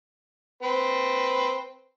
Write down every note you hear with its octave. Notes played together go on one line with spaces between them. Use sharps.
C4 B4